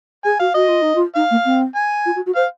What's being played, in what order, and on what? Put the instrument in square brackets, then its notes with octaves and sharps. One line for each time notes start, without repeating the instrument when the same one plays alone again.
[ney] G#4 [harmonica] G#5
[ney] F#4 [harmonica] F5
[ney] F#4 [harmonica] D#5
[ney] F4
D#4
F4
[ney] D#4 [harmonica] F5
[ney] A#3
C4
[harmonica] G#5
[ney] F4
F#4
F#4
[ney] C5 [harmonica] F5